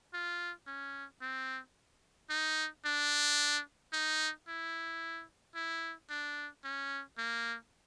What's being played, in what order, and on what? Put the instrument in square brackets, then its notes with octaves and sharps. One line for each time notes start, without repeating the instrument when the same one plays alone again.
[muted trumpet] F4
C#4
C4
D#4
D4
D#4
E4
E4
D4
C#4
A#3